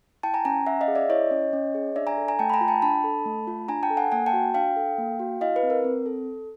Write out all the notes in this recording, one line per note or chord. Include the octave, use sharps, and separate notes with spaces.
E4 G5 A5
G#5 A#5
C#4 G#5 A#5
C#4 E5 F#5
D#5 F5
G#4
D5 E5
E4 C#5 D#5
C#4
C#4
G#4
D4 D5 E5
G#5 A#5
A4
G#5 A#5
A3 G5 A5
B5
G#5 A#5
F4
G5 A5
D4 A5 B5
A4
A3
F4
D4 G#5 A#5
G5 A5
A4
F#5 G#5
A#3 F#5 G#5
G5 A5
F#4
D4 F5 G5
A4
A#3
F#4
E4 D#5 F5
B4
C4
A#4
C4
A4